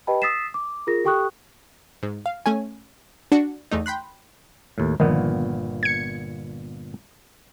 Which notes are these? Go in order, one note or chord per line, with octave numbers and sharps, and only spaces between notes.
G4 B4 D#5 G5 A5 B5
D#6 E6 A6 B6 C7 E7
D6
F4 G#4 A#4 A#6
G4 A4 G5 C#6 D#6 F#6
G#2
F5
A3 C#4 G#5
D4 F#4 C#7
E2 A3 D#4
G5 B5 C6 F#6
D#2 A2
G1 A#2 D#3 F3 B3
G#6 C#7